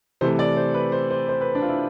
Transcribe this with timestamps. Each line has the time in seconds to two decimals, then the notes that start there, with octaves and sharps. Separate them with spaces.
0.21 C3 E3 A3 C5
0.39 D5
0.57 C5
0.74 B4
0.92 C5
1.11 C5
1.29 C5
1.41 B4
1.55 D4
1.62 F4
1.69 E4